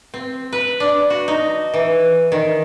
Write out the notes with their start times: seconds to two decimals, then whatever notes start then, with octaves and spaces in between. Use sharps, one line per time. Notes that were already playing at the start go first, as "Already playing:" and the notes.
0.14 C4
0.53 B4
0.80 D4
1.10 F#4
1.28 D#4
1.74 E3
2.32 D#3